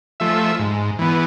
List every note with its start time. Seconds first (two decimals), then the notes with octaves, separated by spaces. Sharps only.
0.20 F3 A3 E5
0.59 G#2
0.99 E3 B3